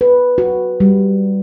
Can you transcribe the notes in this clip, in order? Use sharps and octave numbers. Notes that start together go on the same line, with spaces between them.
B4
F#4
G3